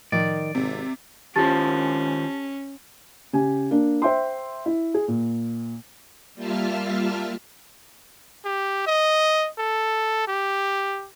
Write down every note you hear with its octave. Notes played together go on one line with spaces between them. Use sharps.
A2 D#3 F3 D5
G#1 C3
D#3 C#4 F4 G4 C5 A5 A6
C#3 G4 G#5
A#3 D4
C5 E5 G5 C6
E4
G#4
A#2
G3 A#3 F4 E5 A5 F6
G4
D#5
A4
G4